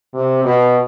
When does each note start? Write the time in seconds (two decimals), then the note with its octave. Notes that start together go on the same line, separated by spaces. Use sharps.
0.14 C3
0.44 B2